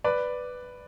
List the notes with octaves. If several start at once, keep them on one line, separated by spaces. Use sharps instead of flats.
B4 D5